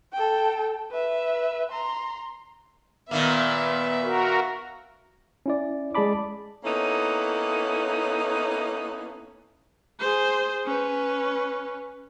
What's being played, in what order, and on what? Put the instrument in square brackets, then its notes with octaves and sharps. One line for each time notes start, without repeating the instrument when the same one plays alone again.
[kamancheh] A4 G5
B4 E5
A#5 C6
[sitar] A#2 D#3 A#3 [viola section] B3 [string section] E5
[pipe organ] F#4 A#4
[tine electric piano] C#4 E4 D5
G#3 G#4 D5 A5 B5 D6
[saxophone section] A#3 B3 C#4 D#4 E4 A4
[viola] G#4 C5
C#4 B4